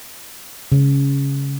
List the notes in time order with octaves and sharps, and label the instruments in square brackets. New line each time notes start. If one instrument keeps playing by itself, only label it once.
[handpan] C#3